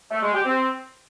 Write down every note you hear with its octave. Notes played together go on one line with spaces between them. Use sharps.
A3
G#3
G4
C4